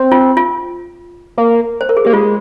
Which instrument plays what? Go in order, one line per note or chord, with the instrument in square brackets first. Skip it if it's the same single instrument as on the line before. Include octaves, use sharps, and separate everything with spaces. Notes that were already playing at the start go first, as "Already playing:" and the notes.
Already playing: [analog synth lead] C4
[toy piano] F4
F4
[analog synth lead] A#3
[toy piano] C5
A#4
G#4
[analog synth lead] A#3 [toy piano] G4
[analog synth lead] G#3 [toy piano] F4